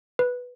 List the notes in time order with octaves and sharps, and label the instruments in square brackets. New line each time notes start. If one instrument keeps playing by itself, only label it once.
[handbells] B4